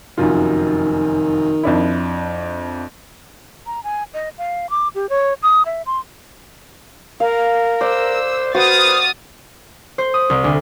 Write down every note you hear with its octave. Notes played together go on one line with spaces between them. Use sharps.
F1 F#2 D#3 F4
F2 D4 E4
A#5
G#5
D#5
F5
D6
G4
C#5
D#6
E5
C6
A#4 F5
C5 D5 E6
F#4 B4 C5 D#6 F6 A6
C5
D#6
C2
D2